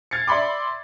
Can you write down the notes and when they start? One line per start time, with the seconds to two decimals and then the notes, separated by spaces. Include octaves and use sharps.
0.11 F6 G#6 A6 C7 C#7
0.28 D5 E5 B5 C6 D6